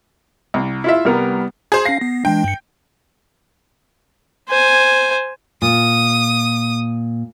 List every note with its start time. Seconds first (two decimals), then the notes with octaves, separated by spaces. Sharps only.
0.54 C2
0.84 E4 F4 E5
1.05 C2 G3 B3 A#4
1.72 G#4 C5
1.85 C#4 F5 A#6 C7
2.01 B3
2.25 E3 G#3 D4 G5
2.44 G2 C#7
4.49 C5 G#5
5.62 A#2 D#6